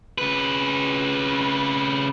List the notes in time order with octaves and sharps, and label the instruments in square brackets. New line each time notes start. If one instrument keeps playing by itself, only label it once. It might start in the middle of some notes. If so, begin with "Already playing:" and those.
[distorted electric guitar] C#3 B4